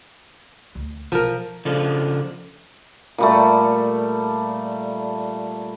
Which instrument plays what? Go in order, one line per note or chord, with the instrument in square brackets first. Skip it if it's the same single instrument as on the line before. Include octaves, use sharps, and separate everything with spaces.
[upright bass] D2
[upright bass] B1 [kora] F3 A#4
[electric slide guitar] C#3 F3 D4 A4
[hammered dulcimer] A#2 G3 A3